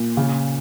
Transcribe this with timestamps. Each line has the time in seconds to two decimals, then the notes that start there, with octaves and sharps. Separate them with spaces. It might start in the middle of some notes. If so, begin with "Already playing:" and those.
Already playing: A#2
0.17 C#3